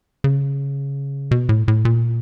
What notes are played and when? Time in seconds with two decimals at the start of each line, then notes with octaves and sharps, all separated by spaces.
0.24 C#3
1.31 B2
1.49 A2
1.68 A2
1.85 A#2